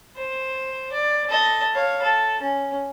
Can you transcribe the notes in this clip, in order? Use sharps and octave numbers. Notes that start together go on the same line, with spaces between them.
C5
D5
A4 D#5
C#5 F5
A4
C#4